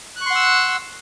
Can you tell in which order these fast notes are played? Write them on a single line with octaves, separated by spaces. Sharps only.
F#6 C#6 C6 F#5 E6